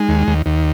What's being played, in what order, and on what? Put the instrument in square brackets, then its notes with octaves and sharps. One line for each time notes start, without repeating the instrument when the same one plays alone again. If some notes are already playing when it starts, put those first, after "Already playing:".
Already playing: [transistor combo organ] G#3 [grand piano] D#4
[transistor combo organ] D#2
D#2
D#2